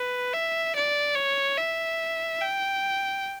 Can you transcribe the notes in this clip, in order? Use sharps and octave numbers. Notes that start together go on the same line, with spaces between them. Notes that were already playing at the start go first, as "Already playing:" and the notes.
Already playing: B4
E5
D5
C#5
E5
G5